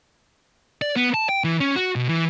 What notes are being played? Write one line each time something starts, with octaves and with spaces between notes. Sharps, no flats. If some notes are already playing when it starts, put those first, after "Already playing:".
D5
B3
A5
G5
E3
C#4
F#4
B2
E3